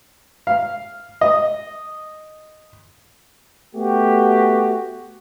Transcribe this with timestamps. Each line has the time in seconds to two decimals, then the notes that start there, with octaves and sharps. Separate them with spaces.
0.47 F5
1.21 D#5
3.75 A3 B3 F#4 G4